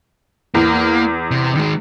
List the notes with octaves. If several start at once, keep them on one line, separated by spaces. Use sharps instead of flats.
E2 A#3
C3
D#3 G#3